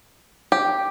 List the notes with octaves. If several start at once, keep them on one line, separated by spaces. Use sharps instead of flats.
G4